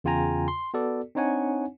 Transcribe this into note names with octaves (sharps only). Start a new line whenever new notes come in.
E2 C#3 F4 G5 G#5 A#5
C6
B3 F#4 A4 D5
C4 D4 D#4 C#5 F#5 G#5